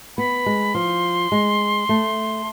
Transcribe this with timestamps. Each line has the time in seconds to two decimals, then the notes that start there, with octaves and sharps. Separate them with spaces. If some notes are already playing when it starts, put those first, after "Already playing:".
0.17 B3 B5
0.46 G#3
0.74 F3 C6
1.32 G#3
1.89 A3